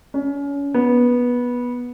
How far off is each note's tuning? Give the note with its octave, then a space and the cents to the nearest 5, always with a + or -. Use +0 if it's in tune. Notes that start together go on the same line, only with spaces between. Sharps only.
C#4 +30
B3 -15